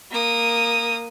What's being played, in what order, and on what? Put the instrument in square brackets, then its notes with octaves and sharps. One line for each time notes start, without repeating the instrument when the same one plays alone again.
[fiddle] A#3 D#6